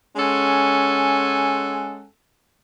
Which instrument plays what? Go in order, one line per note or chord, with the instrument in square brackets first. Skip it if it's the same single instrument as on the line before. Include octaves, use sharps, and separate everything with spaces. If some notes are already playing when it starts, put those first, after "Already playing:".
[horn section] G#3 C#4 A4 F#5 G#5